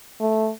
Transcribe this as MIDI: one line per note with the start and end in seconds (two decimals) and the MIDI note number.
0.20 0.50 57